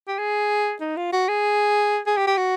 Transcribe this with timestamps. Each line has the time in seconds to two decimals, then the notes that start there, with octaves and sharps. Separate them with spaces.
0.08 G4
0.19 G#4
0.81 D#4
0.97 F4
1.13 F#4
1.28 G#4
2.07 G#4
2.17 G4
2.27 G4
2.38 F#4